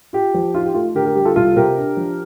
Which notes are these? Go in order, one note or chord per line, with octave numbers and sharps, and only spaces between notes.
F4 G4
F3
D#4 F4
G4
A3 F4 A4
D3 G4 A#4
G4 A#4
G3 G4
F4 A4
C2 F4 A4
C3 G4 A#4
D4
F3